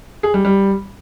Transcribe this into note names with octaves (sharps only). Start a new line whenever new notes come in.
G#4
G3
G3